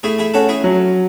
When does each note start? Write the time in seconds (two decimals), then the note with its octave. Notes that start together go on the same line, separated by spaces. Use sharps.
0.03 A3 E4 G#4
0.18 E4 G#4
0.34 C#4 F#4 A4
0.49 E4 G#4
0.64 F#3